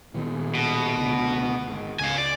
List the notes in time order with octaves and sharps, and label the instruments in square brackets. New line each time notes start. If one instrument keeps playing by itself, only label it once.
[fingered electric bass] A#2 D#3 B3
[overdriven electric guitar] B2
[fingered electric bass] C#2 D3
G#1
[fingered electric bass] C#2 [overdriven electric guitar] F5 G#5
[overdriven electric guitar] D5